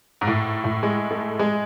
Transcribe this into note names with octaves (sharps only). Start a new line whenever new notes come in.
G#2
A2
A2
G#3
A3
G#3